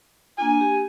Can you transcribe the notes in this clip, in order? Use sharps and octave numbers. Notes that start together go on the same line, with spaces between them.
A#3 D4 F4 G#5
G4